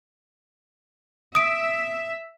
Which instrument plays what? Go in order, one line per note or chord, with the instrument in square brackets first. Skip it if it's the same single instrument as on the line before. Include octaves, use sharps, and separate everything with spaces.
[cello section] E5 [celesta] D#6 D7